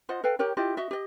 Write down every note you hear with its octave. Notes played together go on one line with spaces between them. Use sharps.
F4 C5 D#5 F#5
A4 B4 F5 G5
G4 A#4 C#5 G5
E4 F4 G4 D#5
F#4 D#5 E5
G4 D#5